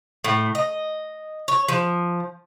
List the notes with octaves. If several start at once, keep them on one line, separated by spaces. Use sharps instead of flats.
A2
D#5
C#5
F3